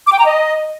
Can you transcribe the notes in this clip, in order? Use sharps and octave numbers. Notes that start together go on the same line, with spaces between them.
D6
G5
A#5
D#5